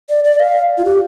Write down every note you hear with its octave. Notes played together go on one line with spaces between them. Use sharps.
D5
D5
F5
F4
G4